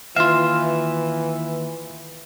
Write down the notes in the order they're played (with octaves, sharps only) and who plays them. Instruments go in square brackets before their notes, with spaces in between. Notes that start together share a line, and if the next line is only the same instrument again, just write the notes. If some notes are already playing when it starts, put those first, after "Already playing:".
[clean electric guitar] D#2 E5 [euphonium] E3 [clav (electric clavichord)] F4 F5